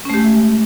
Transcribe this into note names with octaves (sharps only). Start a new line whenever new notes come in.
G#3 A3 C#4 G4